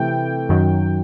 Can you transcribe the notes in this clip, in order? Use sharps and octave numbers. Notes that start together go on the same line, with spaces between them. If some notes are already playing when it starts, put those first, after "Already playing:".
Already playing: C3 E3 A3 G5
F#2 D#3 F#3